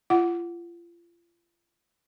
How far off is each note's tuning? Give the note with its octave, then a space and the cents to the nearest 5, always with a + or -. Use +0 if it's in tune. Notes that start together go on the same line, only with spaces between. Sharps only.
F4 -35 F#5 +0